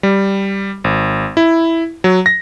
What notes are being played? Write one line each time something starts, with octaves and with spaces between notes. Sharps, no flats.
G3
G#1
E4
F#3
A#6